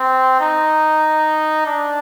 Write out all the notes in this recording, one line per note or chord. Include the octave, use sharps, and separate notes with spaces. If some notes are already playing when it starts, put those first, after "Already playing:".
Already playing: C4
D#4
D4